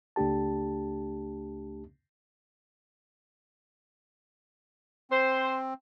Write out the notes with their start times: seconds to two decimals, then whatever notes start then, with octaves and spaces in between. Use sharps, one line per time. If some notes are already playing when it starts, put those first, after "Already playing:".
0.16 C#2 A3 D4 G4 A5
5.10 C4 C5